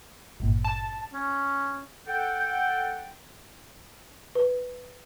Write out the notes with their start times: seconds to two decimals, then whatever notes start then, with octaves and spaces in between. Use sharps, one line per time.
0.40 G#1 G2 A#2
0.64 A5
1.14 C#4
2.07 A4 F#5 G5
4.35 B4